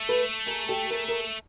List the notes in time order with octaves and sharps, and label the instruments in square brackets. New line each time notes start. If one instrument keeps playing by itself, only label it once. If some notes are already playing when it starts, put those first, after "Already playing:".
Already playing: [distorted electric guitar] A3
[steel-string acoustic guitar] A4 B4
G#4 A#4
G4 A4
G#4 A#4
G#4 A#4